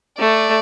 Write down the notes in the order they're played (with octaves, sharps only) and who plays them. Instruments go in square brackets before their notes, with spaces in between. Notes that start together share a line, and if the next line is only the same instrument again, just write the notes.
[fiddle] A3 [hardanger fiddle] D5